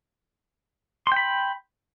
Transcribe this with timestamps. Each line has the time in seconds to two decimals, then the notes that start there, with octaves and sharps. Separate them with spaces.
1.07 C6
1.12 G5
1.16 B5